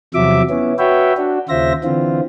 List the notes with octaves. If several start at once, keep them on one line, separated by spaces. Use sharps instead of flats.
E2 C3 F3 F#3 E5 D6
B3 C#4 E4
F#4 B4 C#5 E5 G5
D4 F#4
D#2 C#3 F4 C5 E5 A#6
D3 E3 C4 F4